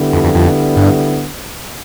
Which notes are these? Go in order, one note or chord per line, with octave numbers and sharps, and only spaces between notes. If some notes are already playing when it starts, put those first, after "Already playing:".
Already playing: D3 G3 B3 E4
F2
F2
F2
G2